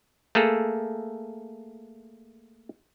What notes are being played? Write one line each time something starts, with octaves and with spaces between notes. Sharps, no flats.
A3 A#3 G#4 A4